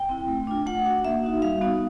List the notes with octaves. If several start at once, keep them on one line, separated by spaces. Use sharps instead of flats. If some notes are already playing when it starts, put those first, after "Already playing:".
Already playing: G5
C4 E4
A3
D4 F4
A3 F#5
D4 F#4
A#3 E5
D#4 F#4
G3 F5
B3 D#4 F#4